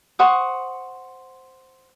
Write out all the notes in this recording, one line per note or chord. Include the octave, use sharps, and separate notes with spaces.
C5 F#5 C#6 D#6